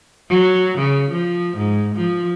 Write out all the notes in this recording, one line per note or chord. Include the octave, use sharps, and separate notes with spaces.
F#3
C#3
F3
G#2
F3